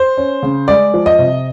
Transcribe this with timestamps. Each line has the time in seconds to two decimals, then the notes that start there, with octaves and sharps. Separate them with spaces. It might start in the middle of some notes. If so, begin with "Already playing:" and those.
Already playing: C5
0.17 C#4
0.43 C#3
0.68 G#3 D5
0.94 F3
1.06 D#5
1.19 C3